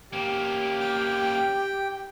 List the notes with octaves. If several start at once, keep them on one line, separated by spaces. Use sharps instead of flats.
A#3 C#4 G4
G5